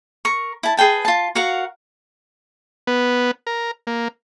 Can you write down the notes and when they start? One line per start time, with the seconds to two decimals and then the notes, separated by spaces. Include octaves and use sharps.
0.25 A#4 C#6
0.63 E4 A5
0.77 G#4 B4 G5 A5
1.05 F4 A5
1.35 F#4 A#4 F5 F#5
2.87 B3
3.47 A#4
3.87 A#3